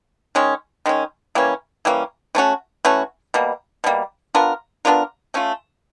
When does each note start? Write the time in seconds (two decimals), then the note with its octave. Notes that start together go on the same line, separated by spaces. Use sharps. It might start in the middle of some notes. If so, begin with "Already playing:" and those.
0.35 D#3 G#3 C#4
0.86 D#3 G#3 C#4
1.35 E3 G3 A#3 C#4
1.85 E3 G3 A#3 C#4
2.35 E3 A3 C#4 F#4
2.85 E3 A3 C#4 F#4
3.34 B2 G3 A#3
3.84 B2 G3 A#3
4.35 B3 D4 F4 A#4
4.85 B3 D4 F4 A#4
5.34 A3 C#4 F4